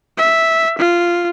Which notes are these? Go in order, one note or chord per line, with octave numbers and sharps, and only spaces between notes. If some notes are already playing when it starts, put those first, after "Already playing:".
E5
F4